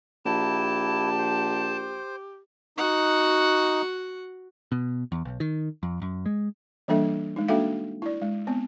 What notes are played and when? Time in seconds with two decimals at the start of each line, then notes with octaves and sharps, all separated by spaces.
0.25 A#1 E4 G4 A5
1.18 C5
2.78 D#4 F#4 F#5
4.72 B2
5.12 E2
5.25 B1
5.40 D#3
5.83 F2
6.02 F#2
6.26 G#3
6.88 E3 G3 A#3 D4 A4 E5
7.36 G#3 D#4
7.48 A#3 D4 F#4 A4 E5 F5
8.02 E4 D5
8.21 G#3
8.47 B3 C4